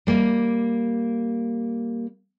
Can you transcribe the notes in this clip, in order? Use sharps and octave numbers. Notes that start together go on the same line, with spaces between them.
G3 A#3